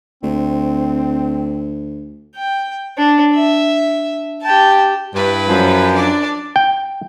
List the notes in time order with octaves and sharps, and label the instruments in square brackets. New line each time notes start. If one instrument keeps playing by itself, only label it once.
[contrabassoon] D2 [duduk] C4
[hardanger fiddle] G5
D4
E5
G4 A5
[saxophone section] G2 [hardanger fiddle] E4 B4
[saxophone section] F#2 F3
[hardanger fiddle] D4 D5
[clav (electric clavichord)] G5